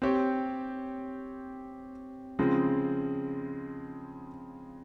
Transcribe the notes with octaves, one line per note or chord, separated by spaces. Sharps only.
C4 G4 C#5
C#3 F3 G#3 C4